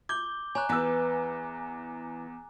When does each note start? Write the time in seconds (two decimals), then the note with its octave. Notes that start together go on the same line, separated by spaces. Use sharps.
0.09 D6 G6 G7
0.55 C#5 G#5 A#5 F#6
0.69 E2 E3 B4 E6